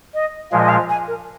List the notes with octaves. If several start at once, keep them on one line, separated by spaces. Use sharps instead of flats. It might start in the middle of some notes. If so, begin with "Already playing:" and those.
D#5
A#2 F3 G#3 F5
D#5
F5
G#5
A#4